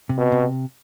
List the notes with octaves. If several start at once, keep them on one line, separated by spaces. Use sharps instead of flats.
C3
B2
C3